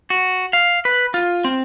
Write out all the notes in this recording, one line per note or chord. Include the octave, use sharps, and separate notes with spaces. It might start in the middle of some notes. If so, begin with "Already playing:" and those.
F#4
F5
B4
F4
C4